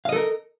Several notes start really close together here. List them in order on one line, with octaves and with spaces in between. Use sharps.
F5 D#5 A4 A#4